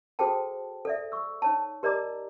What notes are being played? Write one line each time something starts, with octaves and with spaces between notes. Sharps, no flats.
F#4 G#4 A4 C5 G5 A5
A4 D5 E5
C#6 E6
D#4 C#5 A5
G4 A#4 D5 D#5 A#5 D6